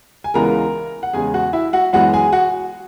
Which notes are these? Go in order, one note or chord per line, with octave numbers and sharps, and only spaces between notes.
G#5
C#2 C#3 E3 G#3 B3 A#4 A#5
F#5
E2 C#3 G#3 G#4 G#5
F#4 F#5
E4 E5
F#4 F#5
F#2 E3 G#3 B3 F#4 F#5
G#4 G#5
F#4 F#5